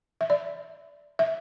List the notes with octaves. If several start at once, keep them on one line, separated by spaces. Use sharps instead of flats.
E5
D5
E5